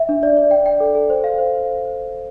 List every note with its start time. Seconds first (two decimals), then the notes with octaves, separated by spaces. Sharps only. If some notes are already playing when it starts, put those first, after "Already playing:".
Already playing: E5
0.09 D4
0.23 D5
0.37 D5
0.51 G5
0.66 G5
0.80 A4
0.95 A4
1.10 C5
1.24 F5
1.38 C5